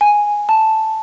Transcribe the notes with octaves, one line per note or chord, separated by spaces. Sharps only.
G#5
A5